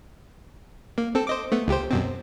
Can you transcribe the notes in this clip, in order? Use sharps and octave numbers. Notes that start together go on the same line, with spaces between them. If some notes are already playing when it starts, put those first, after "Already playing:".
A#3
C4 A4
C5 D#5 D6
A3 B3
C#2 G4 C5
F#2 B2 C4